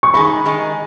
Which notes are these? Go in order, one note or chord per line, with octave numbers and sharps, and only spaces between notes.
C#6
D#3 G#3 D#4 G#4 B5
D#3 G#3 D#4 G#4